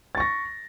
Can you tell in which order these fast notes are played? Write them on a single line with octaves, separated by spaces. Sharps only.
A6 C#6 A#6